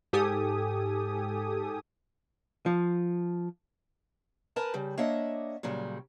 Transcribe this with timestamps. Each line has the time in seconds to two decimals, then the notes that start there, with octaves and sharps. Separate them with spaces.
0.13 G#2 G4 A4 G#5 D#6
2.66 F3
4.56 A#4 B4 G#5 A5
4.74 C#3 G3
4.98 A#3 D4 C#5 D#5 E5 F#5
5.63 A#2 C#3 F#3 G3